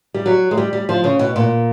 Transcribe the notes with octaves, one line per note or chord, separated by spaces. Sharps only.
G3
F#3
G#3
G3
G3
F3
C#3
B2
A#2